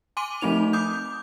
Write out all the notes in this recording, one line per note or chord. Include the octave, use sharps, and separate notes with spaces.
G#5 C6 D6 D#7
F3 A3 C4 D#4 F7
D6 D#6 G6